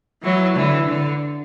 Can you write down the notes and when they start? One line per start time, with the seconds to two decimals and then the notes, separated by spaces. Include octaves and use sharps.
0.22 E3 F#3
0.55 D3 E3
0.87 D3